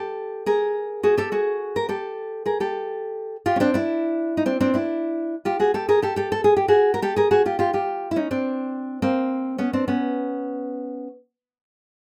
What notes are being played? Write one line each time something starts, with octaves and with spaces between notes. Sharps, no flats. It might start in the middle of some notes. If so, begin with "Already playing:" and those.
Already playing: G4 A4
G#4 A#4
F#4 G#4
G4 A4
F#4 G#4
A#4
G4 A4
G#4 A#4
G4 A4
F4 G4
C#4
C4 D4
D4 E4
D#4
C4 D4
C4 D4
D4 E4
F4 G4
F#4 G#4
G4 A4
G#4 A#4
G4 A4
G4 A4
A4
G#4
G4
F#4 G#4
A#4
G4 A4
G#4 A#4
F#4 G#4
F4 G4
F4 G4
F4 G4
E4
C#4 D#4
C4 D4
A#3 C4
B3 C#4
C4 D4
B3 C#4